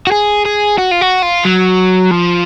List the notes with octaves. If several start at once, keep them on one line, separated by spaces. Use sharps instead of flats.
F#4
G#4
G#4
F#4
F4
F#4
F4
F#3
F3